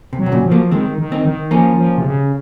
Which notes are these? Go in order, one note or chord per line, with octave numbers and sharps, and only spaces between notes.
C3
F#3
C3
A#2 C#3
F3
F#3 A#3
D#3 G#3 C4
D#3
C4 D#4
D#3
F3 A#3 C#4
F3
C3
C#3